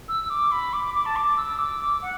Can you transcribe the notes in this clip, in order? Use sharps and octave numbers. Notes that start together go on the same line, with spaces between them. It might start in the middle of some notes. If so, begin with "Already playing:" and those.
E6
D6
B5
D6
D6
D6
A5
D6
E6
D6
F#5